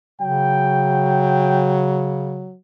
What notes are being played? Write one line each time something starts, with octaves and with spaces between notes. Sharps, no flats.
C#3 F#3 G5